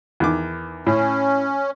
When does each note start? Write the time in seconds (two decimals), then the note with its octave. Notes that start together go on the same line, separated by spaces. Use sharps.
0.20 E2 D#3 D6
0.86 A2 C#4